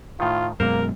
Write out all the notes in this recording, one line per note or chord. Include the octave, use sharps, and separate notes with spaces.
A2 D#3 F4
F#2 B2 G#3 A#3 A#4 C5